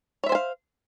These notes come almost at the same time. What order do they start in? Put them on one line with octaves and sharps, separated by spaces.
C#5 E5 C5 G#5 F5